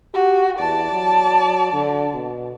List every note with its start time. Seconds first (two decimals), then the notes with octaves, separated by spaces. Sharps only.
0.14 F#4 G4
0.59 E2 D5 A5
0.92 F#3
1.73 D3
2.14 B2